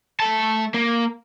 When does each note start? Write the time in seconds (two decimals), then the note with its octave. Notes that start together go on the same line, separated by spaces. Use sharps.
0.20 A3 A5
0.74 A#3